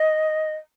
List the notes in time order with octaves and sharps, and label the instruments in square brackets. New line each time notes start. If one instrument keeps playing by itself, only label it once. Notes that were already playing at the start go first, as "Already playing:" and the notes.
Already playing: [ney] D#5